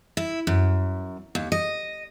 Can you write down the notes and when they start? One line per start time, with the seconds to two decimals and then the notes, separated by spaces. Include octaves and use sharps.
0.17 E4
0.47 F#2
1.35 D#2
1.52 D#5